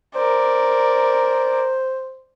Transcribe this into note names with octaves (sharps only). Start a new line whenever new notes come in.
A#4 C5 D5